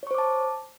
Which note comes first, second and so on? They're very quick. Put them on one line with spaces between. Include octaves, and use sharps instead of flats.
C#5 C#6 C5 D6 A5